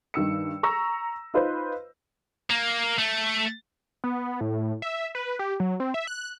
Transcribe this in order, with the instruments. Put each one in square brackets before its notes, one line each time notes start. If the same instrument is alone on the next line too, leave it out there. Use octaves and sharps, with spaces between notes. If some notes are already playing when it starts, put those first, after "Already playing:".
[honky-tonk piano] G2 D#3 E6 C#7
A#5 C#6 E6 A#6
D#4 F4 B4 C5
[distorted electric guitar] A#3
A3
[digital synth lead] B3
A2
E5
B4
G4
F#3
C4
E5
F#6